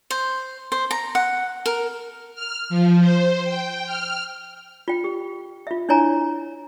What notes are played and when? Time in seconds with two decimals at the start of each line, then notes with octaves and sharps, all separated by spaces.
0.10 C5
0.72 C5
0.91 A#5
1.15 F#5
1.66 A#4
2.35 F6
2.69 F3
3.00 C5
3.45 G5
3.86 F6
4.88 F4 G5
5.04 G4
5.67 F4 E5
5.89 D4 E4 C#5 G#5 A#5